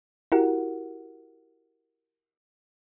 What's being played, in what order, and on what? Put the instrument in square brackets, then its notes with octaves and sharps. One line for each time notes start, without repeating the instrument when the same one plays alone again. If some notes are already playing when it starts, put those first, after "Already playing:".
[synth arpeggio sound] E4 F#4 G4 A#4 F#5